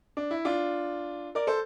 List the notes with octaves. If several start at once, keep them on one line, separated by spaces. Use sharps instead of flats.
D4
E4
D4 F4
A#4 D5
A4 C5